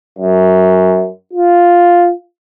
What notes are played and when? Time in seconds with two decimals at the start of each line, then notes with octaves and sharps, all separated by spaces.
0.19 F#2
1.33 F4